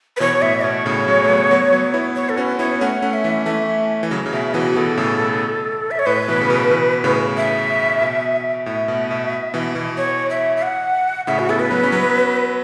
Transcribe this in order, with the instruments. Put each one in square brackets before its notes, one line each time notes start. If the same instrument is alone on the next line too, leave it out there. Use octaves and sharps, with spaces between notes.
[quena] B4
[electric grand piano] B2 E3 [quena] C#5
[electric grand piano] A2 [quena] E5
[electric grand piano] B2 [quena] C#5
[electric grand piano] A2 C#3
C#3 F#3
A3
F#3 B3
F#3 B3
F#3 B3
B3 E4
[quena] C#5
A4
[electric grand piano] C#4 F#4 [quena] B4
[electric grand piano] B3 E4 [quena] C#5
[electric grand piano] A3 C#4 [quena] F#5
[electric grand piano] A3 C#4
[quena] E5
[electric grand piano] E3 A3
[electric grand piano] E3 A3 [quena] E5
[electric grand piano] E3
C#3 F#3
C#3
[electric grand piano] B2 [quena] E5
[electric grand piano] B2 E3 [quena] F#4
[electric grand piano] B2 E3 [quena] A4
[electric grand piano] A2 C#3
B2
[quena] E5
C#5
[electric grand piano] A2 [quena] B4
[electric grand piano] B2 E3
C#3
B2
B2 E3
A2 C#3
[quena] E5
[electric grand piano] B2
[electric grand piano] A2 [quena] E5
[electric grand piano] B2
B2
B2 E3
B2 E3
[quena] C#5
E5
E5
F#5
[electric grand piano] A2 C#3 [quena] E5
[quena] F#4
[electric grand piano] B3 E4 [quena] A4
[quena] B4
[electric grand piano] F#3 B3
C#4
F#3 B3